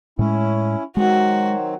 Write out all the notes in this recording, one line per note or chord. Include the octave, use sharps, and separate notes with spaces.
A2 G#3 C#4 E4
D#3 F#3 G#3 C4 F#4